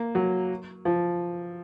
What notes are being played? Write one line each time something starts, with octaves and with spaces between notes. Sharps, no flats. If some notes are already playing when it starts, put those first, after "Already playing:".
Already playing: A#3
F#3
F3